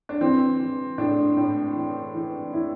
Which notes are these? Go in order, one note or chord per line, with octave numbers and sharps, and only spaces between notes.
D4
E3 C4
E3
A2 D4
A2
E3
E3
E3 E4